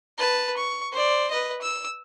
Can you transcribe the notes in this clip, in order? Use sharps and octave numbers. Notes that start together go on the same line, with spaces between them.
B4 A5
C#6
C5 D5
B4 D#5
E6